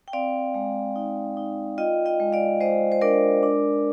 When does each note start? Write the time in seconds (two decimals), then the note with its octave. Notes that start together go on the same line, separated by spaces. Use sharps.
0.08 G5
0.13 C4 D5 F5
0.54 G#3
0.96 D#4
1.37 D#4
1.78 F4 D#5 G5
2.06 D#5 G5
2.20 G#3
2.33 D5 F5
2.61 G#3 C5 D#5
2.92 C5
3.01 D4 A#4 D5
3.43 D4